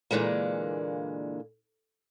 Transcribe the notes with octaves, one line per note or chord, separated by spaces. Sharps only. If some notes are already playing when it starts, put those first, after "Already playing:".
A#2 D3 E3 G#3 A#3